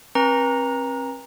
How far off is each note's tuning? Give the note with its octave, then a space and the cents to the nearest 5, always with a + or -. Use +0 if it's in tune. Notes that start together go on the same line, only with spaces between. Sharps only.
C4 +45 B4 -45 A#5 +0